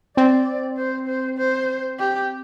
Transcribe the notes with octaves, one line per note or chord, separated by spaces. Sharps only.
C4 D5
C5
C5
C5
G4